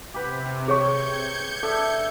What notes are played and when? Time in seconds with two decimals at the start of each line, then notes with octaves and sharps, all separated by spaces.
0.14 C3 G4 B4
0.68 G#4 C#5 C#6 G6 G#6 C#7
1.63 D4 A4 E5